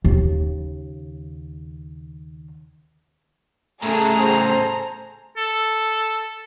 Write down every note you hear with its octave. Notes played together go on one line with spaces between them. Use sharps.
D#2 C#3
A2 C#3 A3 G#4 A4 A#5
C5
A4